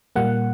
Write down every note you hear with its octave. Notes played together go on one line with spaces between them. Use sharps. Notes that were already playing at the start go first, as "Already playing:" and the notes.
A#2 G3 A#3 F#5